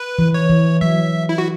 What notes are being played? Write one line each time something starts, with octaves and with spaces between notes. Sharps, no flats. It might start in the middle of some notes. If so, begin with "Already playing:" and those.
Already playing: B4
E3
C#5
E3
F#3 E5
E4
F#4